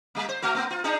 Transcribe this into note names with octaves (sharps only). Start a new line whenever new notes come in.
G3 A#3
C5
A3 F#4 A#4
A3 B3
F4
D4 D#4 G#4